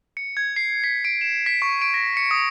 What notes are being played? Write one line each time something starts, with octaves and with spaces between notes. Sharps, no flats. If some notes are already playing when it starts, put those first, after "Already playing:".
C#7
G#6
C7
B6
D7
E7
B6
C#6
D7
A#6
C#7
D#6